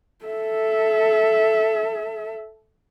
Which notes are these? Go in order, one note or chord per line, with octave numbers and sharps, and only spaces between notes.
A4 E5